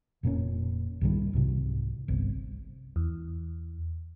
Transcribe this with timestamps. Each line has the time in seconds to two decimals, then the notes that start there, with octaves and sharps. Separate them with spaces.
0.23 F1 A#2 A#3 C#4
1.01 C2 G#2 D#3 G3
1.33 C2 G#2 C3
2.08 G1 C2
2.96 E2